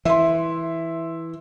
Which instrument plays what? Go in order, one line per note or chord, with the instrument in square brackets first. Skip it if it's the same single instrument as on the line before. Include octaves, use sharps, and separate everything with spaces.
[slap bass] E3 [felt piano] E5 C6